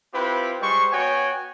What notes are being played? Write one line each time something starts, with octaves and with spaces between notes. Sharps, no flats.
C4 E4 F4 G4 B4
G3 G#3 C5 C#6
B3 F#4 C#5 G5 G#5